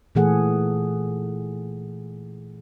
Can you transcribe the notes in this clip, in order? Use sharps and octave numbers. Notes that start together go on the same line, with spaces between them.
A#2 E3 A3 G#4 A4 F#5